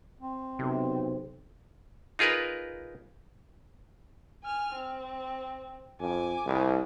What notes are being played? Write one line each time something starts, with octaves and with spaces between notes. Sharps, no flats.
C4
B1 C3
D#4 F4 G#4 A#4 B4
G#5 F6
C4
F2 G#5 D6
C2